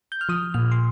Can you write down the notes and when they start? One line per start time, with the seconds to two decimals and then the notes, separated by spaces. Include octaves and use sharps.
0.12 G6
0.21 F6
0.29 F3 D#6
0.54 A#2 F6
0.72 C6